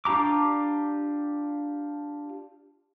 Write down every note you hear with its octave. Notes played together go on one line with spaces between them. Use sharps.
D4 F4 G4 A#5 D6